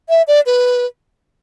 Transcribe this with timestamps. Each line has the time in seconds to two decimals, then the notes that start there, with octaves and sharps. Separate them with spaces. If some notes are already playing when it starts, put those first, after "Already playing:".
0.09 E5
0.28 D5
0.46 B4